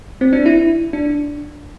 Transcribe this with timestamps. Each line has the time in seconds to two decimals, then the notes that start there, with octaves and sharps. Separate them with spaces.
0.21 C4
0.33 D4
0.46 E4
0.93 D4